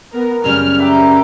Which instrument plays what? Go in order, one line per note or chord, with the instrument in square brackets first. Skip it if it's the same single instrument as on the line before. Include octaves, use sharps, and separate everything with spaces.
[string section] B3 A#4
[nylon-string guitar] F#2 C#3 G3 [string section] F6
[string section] G4 [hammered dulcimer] A#4 B4 E5